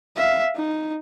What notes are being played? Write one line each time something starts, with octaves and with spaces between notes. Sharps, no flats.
E5 F5
D#4